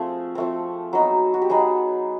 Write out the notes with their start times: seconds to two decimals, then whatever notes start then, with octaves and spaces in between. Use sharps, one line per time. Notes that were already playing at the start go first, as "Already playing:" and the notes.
Already playing: F3 A3 C4 G#4
0.35 F3 A3 C4
0.93 F#3 B3 D#4
1.34 F#4
1.42 G4
1.49 F#3 B3 D#4 G#4